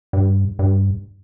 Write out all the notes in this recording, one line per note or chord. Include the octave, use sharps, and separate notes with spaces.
G2
G2